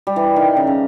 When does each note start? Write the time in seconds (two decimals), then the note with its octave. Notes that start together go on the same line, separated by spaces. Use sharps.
0.07 G3
0.16 E3
0.36 D#3
0.57 C#3
0.67 C#3